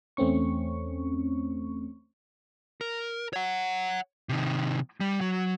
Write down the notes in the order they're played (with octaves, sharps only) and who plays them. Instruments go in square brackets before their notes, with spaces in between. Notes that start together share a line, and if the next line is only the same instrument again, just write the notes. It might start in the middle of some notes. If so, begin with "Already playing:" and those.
[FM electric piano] E2 A3 C4 C#4 C#6
[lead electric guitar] A#4
C#5 F#5
C3 D#3
G3
F#3